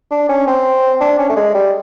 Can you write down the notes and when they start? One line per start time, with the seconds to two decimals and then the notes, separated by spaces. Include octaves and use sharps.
0.11 D4
0.29 C#4
0.47 C4
1.01 D4
1.19 C#4
1.29 A3
1.36 G#3
1.54 G3